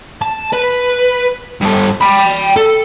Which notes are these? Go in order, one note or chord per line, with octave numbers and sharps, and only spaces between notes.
A5
B4
G2 A4
G5 B5
A4